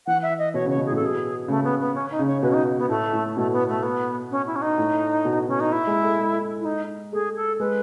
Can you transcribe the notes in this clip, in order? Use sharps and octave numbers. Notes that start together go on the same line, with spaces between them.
E3 F#5
E5
D#5
B2 C#5
C#3 C#5
B2
A2 G#4
A4
B2 G#4
C#3 A3
B3
B3
C#4
D#4
C#3
C#5
B2 B4
C#4
D#4
B3
A2 A3
A2
B2 A3
B3
A3
B3
C#4
E4
C#4
D#4
A2
B2
B2 C#4
D#4
E4
G#3
A3
G#3
E4
D#4
A3 G#4
A4
G#3 B4